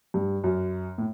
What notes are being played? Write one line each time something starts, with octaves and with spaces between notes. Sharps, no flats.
G2
F#2
A2